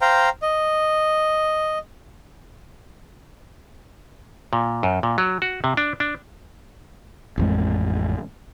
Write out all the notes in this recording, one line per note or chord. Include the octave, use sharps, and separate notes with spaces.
C5 F5 G5 A#5
D#5
A#2
F#2
A#2
F#3
F#4
C3
D4
D4
A1 F2 G#3